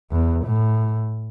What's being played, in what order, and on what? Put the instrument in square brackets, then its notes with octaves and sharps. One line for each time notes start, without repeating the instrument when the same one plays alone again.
[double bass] E2
A2